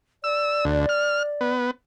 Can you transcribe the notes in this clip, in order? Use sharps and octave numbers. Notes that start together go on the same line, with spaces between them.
D5 E6
D2
F6
B3